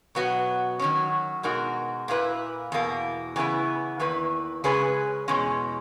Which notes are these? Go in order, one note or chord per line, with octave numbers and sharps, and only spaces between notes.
B2 F#3 B3 F#4
D#3 F#3 C#4
B2 G#3 D#4 F#4 A#4
A#2 A#3 E4 B4
E2 B2 A#3
C#3 E3 B3 E4 B4
E2 D#3 A#3 E4 B4
C#3 G#3 C#4 G#4 B4
E2 B2 G#3 C#4